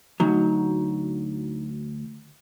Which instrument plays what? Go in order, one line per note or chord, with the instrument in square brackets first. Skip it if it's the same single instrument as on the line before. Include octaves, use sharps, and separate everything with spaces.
[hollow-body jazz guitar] D2 F#3 [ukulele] D#4